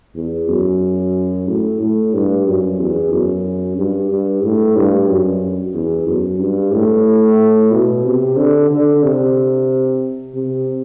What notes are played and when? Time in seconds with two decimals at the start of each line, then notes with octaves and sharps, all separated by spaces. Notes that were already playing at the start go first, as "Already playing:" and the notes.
0.15 E2
0.48 F#2
1.48 A2
1.80 A2
2.14 G2
2.47 F#2
2.79 E2
3.12 F#2
3.77 G2
4.10 G2
4.44 A2
4.76 G2
5.09 F#2
5.74 E2
6.07 F#2
6.40 G2
6.74 A2
7.72 B2
8.05 C3
8.37 D3
8.71 D3
9.03 C3
10.35 C3